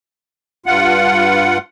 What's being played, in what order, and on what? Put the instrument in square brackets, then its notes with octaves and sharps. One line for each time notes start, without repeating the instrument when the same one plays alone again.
[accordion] G2 F4 F#5